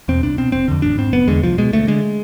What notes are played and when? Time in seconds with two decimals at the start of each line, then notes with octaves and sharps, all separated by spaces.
0.08 E2 B2 C4
0.23 C2 D4
0.38 B2 C4
0.52 F1 C4
0.68 F2 D3
0.82 A1 D4
0.98 G#2 C4
1.13 F1 B3
1.27 E2 D3 G#3
1.43 C2 F3
1.58 B2 G#3
1.73 D2 A3
1.87 D3 G#3